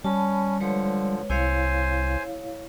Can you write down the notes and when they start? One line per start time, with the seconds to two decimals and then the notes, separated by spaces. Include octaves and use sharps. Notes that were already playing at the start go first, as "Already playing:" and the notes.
0.04 G3 C#4 A5 B5
0.60 D3 F3 G#3 B4 C#5
1.30 C2 E4 C5 C#5 F5 G#5